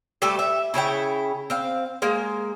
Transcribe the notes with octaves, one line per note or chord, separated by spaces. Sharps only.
G3 A3 G4 A4
E5
C#3 E4 C#5 G5
C4 F5
G#3 A#3